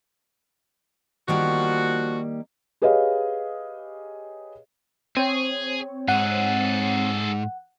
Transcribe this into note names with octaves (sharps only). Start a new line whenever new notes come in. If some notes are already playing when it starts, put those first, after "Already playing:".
D#3 F3 G3 A#3 F#4
G4 G#4 B4 C#5 D#5 F5
C4 G#4 C#5
G#2 G#4 A4 F#5